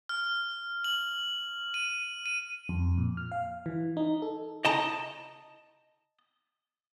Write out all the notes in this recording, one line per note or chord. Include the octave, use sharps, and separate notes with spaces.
F6
F#7
D#7
D#7
F2
A#2
F6
F5
E3
D#4
A4
D#5 A5 A#5